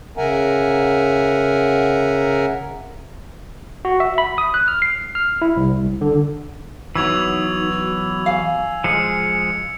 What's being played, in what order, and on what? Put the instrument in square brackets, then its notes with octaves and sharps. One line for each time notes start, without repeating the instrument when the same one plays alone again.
[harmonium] C#3 A#4 E5 F#5 G#5 A#5
[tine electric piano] F#4
E5
B5
D#6
F#6
F6
C7
F6
E4
C2
D3
[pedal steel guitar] E3 F#3 B3 [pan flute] D#4 [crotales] E6 G#6 F7
[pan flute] F#4
[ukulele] F5 [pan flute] G#5
[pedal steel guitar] F3 G#3 G#4 [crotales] C#7